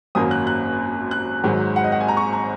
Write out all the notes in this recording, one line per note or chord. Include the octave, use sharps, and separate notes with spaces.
G#1 F#2 F#3 A#3 D#6
F#6
F#6
F#6
G#1 G#2 F#3
F#5
D#5
F#5
G#5
A#5
C#6
A#5